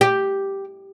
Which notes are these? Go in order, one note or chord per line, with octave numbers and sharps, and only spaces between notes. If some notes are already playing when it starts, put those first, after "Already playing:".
G4